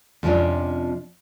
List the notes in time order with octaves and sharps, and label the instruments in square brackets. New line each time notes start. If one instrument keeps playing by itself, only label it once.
[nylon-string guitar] F2 C3 F3 C#4 D4